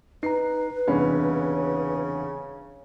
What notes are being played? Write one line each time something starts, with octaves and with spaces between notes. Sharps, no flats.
D#4 B4 A#5 C7
E1 C2 C#3 C#4 D4 B5